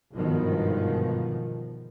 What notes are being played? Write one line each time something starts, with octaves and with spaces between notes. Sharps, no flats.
G1 G#2 B2 D#3 F3